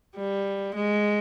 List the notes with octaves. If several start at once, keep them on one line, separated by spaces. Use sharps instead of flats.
G3
G#3